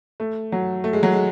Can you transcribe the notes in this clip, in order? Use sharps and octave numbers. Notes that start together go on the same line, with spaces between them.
A3
F#3
A3
G#3
F#3
G#3